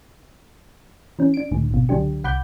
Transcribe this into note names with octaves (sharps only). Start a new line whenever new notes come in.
E3 C#4
D4 D7
C#2 A2 D3
G#1 B2
C#2 D3 F#3 D4 G4
C2 F#5 B5 D6 G6